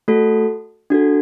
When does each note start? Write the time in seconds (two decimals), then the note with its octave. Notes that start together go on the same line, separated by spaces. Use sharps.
0.08 A3 F#4 A4
0.90 D4 F#4 A4